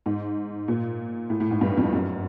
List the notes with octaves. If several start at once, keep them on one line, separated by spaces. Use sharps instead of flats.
G#2
A#2
A2
A2
G#2
G2
F2
F#2